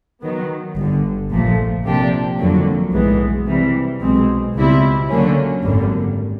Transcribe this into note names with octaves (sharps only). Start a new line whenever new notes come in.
D#3 F#3 B3
G1 G2 D3
A#1 A#2 F3 A3
C3 F3 A#3 D4 G4
G1 F2 D3 F#3 A#3
B1 A2 E3 G#3 B3
C3 E3 G3
B1 B2 G#3 C4
C#2 B2 G3 C4 E4
D3 F#3 A#3 C#4
G#1 F#2 D3 G3 A#3